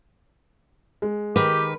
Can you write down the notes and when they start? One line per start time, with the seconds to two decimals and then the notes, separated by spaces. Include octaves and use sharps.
1.02 G#3
1.36 D#3 G4 B4